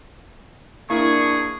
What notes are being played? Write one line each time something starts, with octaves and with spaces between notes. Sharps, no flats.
A#3 D4 E4 G#4 C#6